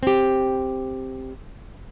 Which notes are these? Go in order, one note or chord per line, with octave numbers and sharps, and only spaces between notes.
C4 G4